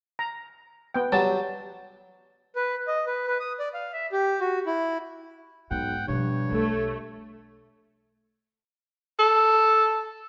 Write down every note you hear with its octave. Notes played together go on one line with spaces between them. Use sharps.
A#5
B3 G5
F#3 G3 A5
B4
D#5
B4
B4
D#6
D5
F5
E5
G4
F#4
E4
B1 G#2 F#5 G5
G2 B2 F3 C#5
B1 A3
A4